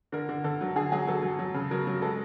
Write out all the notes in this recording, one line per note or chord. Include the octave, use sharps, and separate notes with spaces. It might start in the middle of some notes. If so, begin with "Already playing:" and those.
D3 A#4
D3
D3 A4
F#3
D3 G#4
F#3 G#4
F#3 A4
F#3
F#3
C#3
F#3 A#4
F#3
G#3 A4